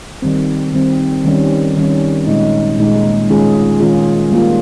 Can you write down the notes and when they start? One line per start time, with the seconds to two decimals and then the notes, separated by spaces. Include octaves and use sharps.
0.22 D#3 G3 C4
0.73 D#3 G3 C4
1.25 D#3 G3 C#4
1.76 D#3 G3 C#4
2.27 A#2 G#3 D#4
2.78 A#2 G#3 D#4
3.29 D#3 G#3 C#4 F4 G#4
3.80 D#3 G#3 C#4 F4 G#4
4.31 G3 A#3 F4